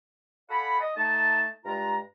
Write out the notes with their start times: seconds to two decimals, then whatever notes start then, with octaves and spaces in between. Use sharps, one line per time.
0.49 A4 D5 F5 F#5 G#5 B5
0.80 D#5
0.96 A3 D#4 A5
1.65 G2 G#3 F4 A#5